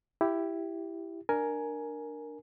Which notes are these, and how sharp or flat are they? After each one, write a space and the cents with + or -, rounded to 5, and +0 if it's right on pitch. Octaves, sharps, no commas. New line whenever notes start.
E4 +10 G4 +0
D4 +15 A#4 +0 G#5 +10